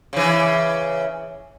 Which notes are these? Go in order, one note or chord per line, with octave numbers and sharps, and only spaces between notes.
C#3 E3